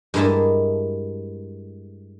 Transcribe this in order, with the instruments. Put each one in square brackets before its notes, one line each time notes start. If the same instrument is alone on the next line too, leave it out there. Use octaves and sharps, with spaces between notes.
[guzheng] G2 G#3 A#3 E4 D#5 A5